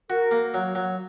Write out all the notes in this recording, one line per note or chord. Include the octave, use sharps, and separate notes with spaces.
F#4 A#4
A#3
F#3
F#3